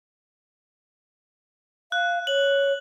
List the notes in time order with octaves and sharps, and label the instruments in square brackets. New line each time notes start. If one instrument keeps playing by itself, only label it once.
[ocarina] F5 [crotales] F#6
[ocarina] C#5 [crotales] F#7